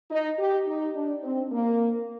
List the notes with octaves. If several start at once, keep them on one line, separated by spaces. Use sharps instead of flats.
D#4
G4
D#4
D4
C4
A#3